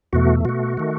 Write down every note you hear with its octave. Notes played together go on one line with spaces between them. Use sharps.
E2 B2 A3 F#4
B2 A3 F#4
D#3 A3